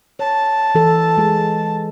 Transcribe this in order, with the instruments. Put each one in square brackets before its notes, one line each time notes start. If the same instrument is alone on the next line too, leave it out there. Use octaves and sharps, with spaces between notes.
[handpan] C#5 [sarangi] A5
[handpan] E3 A4
G#3 G#4